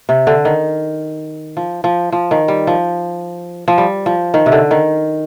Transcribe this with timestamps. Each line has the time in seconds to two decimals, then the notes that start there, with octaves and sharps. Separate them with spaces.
0.09 C3
0.27 D3
0.45 D#3
1.57 F3
1.84 F3
2.12 F3
2.31 D#3
2.48 G3
2.67 F3
3.68 F3
3.78 G3
4.06 F3
4.34 D#3
4.46 C3
4.52 D3
4.71 D#3